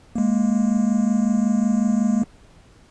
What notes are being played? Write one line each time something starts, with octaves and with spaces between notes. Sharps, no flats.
G#3 A#3